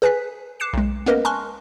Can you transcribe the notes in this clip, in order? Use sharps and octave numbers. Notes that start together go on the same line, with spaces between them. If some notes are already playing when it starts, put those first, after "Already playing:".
G#4 B4 G#5 F#6 B6
D6 F#6 C7 C#7 E7
B1 G#3
A#3 B3 C#4 A#4 B4 D#5
G#5 A5 C6 C#6 F6 F#6